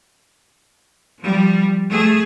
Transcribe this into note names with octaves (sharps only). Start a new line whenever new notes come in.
F3 G3
A3 G#4